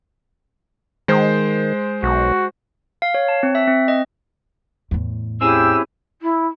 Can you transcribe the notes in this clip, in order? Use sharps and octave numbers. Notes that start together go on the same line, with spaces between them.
D#3 G#3 C5
B1 F#4
F5
C#5
A5
C4
E5
C4
D#5
E2 A2
C4 C#4 E4 G4 G#4 E6
E4